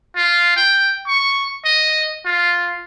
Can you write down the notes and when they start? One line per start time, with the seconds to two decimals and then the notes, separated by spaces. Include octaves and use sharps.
0.16 F4
0.57 G5
1.08 C#6
1.65 D#5
2.25 F4